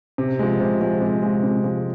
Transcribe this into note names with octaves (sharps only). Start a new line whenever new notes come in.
C3
F3 G#3
C3
F3 G#3
C3
F3 G#3
C3
F3 G#3